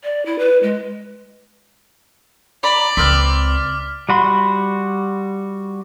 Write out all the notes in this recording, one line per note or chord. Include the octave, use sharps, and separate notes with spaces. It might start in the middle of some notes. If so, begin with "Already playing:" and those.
D5
E4
B4
G#3
D5 A#5 B5 D6
C#2 C4 B4 D6 F6 F#6 B6
G3 F#4 B5 C6